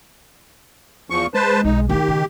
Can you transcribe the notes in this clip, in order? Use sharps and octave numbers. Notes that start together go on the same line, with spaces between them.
E2 F3 C#6
G#3 B4 C5 A5
B1 D#4
D#3 A#3 D#4 G4
C#3